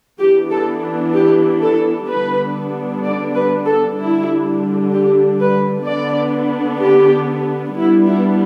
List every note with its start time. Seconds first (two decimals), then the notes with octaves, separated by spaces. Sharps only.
0.19 E3 B3 D4 G4
0.51 A4
1.14 G4
1.62 A4
2.09 D3 G3 B3 D4 B4
3.03 D5
3.34 B4
3.66 A4
3.98 D3 G3 D4 E4
4.92 G4
5.40 B4
5.86 D3 B3 D4 D5
6.81 G4
7.75 G3 B3 D4 E4
8.07 E4